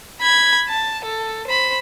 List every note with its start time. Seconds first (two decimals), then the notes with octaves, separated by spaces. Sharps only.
0.22 B5 G#6
0.69 A5
1.05 A4
1.48 C5 B5